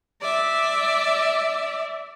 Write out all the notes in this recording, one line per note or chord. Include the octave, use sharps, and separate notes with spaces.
D5 E5